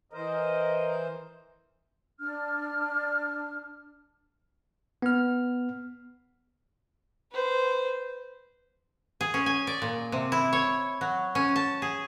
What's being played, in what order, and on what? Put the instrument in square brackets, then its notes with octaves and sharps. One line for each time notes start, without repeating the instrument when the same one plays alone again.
[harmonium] E3 C5 [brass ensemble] A#4 D#5
[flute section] D4 F6
[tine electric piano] B3 F6
[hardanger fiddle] B4 C5
[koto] G#4
C#4
G#5
D5
A#2
C3
E4
C#5
F#3
C#4
A5
G#4